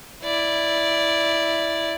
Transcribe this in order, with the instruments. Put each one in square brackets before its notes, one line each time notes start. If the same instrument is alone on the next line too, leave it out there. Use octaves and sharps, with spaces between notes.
[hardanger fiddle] E4 D5